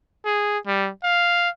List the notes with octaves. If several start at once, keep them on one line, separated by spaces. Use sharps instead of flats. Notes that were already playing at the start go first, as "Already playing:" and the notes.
G#4
G3
F5